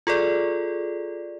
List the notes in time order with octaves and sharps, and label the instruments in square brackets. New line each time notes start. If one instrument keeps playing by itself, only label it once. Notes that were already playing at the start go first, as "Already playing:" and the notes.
[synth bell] F4 G#4 A4 D5